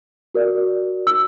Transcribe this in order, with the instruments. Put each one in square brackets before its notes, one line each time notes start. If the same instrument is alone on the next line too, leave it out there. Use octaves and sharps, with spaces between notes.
[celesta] F#4 A#4 D5
E6